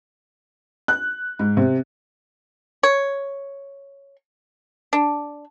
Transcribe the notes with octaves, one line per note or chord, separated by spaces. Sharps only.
F#6
G#2
C3
C#5
D4